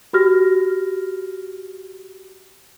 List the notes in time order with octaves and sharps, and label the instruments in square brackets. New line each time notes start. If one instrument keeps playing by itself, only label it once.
[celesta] F#4 G4 F6 A#6